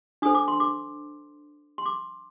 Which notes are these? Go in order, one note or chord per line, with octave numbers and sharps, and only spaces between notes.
D4 A4 C5 D#6
D6
C6
D6
C6
D6